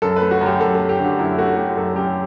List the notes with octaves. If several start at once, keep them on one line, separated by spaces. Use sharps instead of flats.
F#2 A4
A3 B4
F#4
F#2 G4
F#2 A4
A3 A4
G4
D3
F#4
F#2 E4
A3 F#4
A3 G4
F#2 A4
F#2 G4